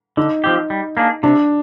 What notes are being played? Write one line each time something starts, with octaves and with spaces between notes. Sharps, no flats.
D3 D#4
F3 C4 G4
G3
A#3 D4 G#4
C3 D4